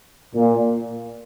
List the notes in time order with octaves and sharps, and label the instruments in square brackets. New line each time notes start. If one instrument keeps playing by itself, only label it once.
[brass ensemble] A#2